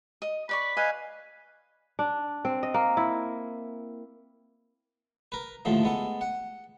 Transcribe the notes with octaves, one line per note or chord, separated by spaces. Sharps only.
D#5
B4 D5 B5 C#6
B4 D#5 F5 G#5
D4
C4
D#5
A#3
E4
A#4 B4
D#2 A2 D3 F3 A3
G#3 B3 A4
F#5